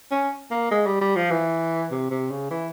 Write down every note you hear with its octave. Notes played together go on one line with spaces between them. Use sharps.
C#4
A#3
G#3
G3
G3
F3
E3
C3
C3
C#3
E3